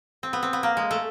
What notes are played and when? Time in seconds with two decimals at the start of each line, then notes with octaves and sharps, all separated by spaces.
0.23 C4
0.33 B3
0.43 C4
0.53 B3
0.63 A#3
0.77 G#3
0.91 A3